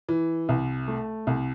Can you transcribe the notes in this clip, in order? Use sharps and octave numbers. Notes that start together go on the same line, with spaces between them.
E3
C2
A3
C2